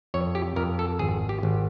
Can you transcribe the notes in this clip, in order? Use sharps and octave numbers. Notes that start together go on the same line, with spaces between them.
F2 C#5
G4
F2 A#4
A4
G#1 G#4
G4
G#1